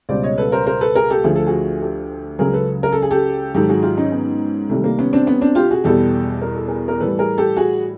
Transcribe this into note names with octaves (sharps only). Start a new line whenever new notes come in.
C#2 B2 G3 C5 D5
C#5 D#5
A4 B4
A#4 C5
A#4 C5
A4 B4
G#4 A#4
G4 A4
D2 D3 F3 G#4
A4
F#4 G#4
G4 A4
C#2 C#3 F#3 G#4 A#4
A4 B4
A#4
A4
G#4
G4 A4
G#2 D#3 F#3 G4 A4
F#4 G#4
F4 G4
C#4 D#4
B3 C#4
C2 C3 D#3 G3 A3
A#3
B3 C#4
C4 D4
B3 C#4
C4 D4
F4 G4
F#4 G#4
E2 B2 G3 G4 A4
A#4
A4
G#4 A#4
A#4
A2 E3 G3 A4 B4
G#4 A#4
G4 A4
F#4 G#4